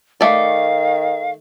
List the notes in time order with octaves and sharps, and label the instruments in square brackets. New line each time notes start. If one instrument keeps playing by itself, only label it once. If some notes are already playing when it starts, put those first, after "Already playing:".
[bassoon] D#3 [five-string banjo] A3 D5 [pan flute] F5